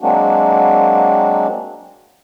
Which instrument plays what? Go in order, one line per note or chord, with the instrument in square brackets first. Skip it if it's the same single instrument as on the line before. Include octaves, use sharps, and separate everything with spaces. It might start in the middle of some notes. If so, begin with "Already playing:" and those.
[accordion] F#3 G#3 A#3 C4 D4 F#4